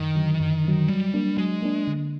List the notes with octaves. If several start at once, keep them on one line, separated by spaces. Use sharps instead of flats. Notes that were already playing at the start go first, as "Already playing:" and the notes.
Already playing: F#2 D#3
D3 F#3
F#2
D3 F#3
F#3 G3
A#3 D4
F#3 G#3
A#3 D4
D3